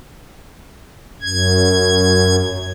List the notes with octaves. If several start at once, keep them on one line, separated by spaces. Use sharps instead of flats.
F#2 G#6